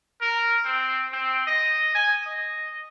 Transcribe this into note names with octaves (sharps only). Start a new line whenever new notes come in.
A#4
C4
C4
D#5
G#5
D#5